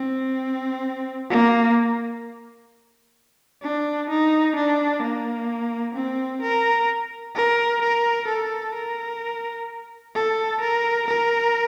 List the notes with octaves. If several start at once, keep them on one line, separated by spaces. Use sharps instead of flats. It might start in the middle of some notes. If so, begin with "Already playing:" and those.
Already playing: C4
A#3
D4
D#4
D4
A#3
C4
A#4
A#4
A#4
A4
A#4
A4
A#4
A#4